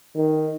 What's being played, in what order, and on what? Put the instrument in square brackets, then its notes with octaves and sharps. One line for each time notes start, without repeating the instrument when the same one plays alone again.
[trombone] D#3